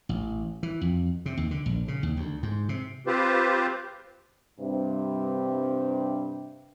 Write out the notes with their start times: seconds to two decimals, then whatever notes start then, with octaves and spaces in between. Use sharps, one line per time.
0.09 A1
0.63 E3
0.81 F2
1.26 C3
1.37 D#2
1.51 D3
1.66 A#1
1.88 C#3
2.03 D#2
2.17 D2
2.43 G#2
2.69 C3
3.07 C4 F4 G4 B4 C5
4.59 G2 C3